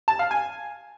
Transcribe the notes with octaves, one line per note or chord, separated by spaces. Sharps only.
A5
F5
G#5